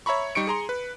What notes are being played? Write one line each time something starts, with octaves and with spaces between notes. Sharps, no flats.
C#5 E5 A#5 B5 C#6
G3 D#4 C#6 C#7 D7
G#4 A#5 C6
B4